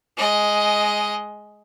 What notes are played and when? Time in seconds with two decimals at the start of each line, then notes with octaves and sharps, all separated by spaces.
0.17 G#3 D#5